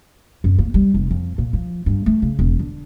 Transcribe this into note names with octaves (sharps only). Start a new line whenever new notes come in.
F#2
A#3
G3
F1
F2
A#2
F3
G2
A3
C#3
E1
D3